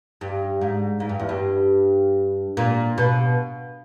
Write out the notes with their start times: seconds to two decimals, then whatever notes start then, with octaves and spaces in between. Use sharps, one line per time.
0.21 G2
0.61 G#2
1.00 G#2
1.09 G2
1.19 E2
1.29 G2
2.57 A#2
2.98 B2